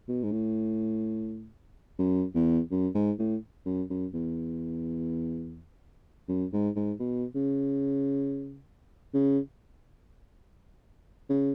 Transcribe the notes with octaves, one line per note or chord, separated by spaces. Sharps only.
B2
G#2
A2
F#2
E2
F#2
G#2
A2
F#2
F#2
E2
F#2
G#2
G#2
B2
C#3
C#3
C#3